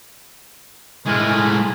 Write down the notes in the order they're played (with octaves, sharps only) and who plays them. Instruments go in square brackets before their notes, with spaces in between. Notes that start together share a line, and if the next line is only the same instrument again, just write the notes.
[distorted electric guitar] A2 G#3 [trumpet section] A3 A#4 G#5